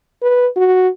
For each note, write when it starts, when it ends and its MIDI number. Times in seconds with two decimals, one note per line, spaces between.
0.22 0.47 71
0.56 0.88 66